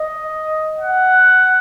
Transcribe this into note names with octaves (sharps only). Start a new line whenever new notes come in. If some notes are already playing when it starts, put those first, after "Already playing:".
Already playing: D#5
F#5